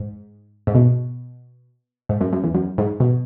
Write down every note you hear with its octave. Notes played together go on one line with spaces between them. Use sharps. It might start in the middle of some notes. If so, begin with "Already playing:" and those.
Already playing: G#2
G#2
B2
G#2
F#2
F#2
E2
F#2
G#2
B2